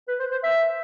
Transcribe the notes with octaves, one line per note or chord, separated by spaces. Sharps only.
B4
C5
C5
E5